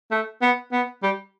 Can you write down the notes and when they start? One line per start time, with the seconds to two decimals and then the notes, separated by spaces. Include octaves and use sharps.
0.11 A3
0.42 B3
0.72 B3
1.03 G3